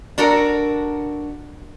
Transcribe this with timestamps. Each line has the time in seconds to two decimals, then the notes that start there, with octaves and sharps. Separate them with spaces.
0.18 D4 F#4 A4 A#4